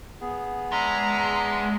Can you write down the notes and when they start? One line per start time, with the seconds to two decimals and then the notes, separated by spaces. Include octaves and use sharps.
0.21 B3 G#4
0.72 G#3 D4 E5 A#5